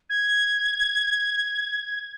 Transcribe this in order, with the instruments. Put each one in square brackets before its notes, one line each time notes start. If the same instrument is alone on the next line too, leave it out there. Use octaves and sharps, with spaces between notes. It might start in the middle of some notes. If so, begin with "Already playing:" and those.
[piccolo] G#6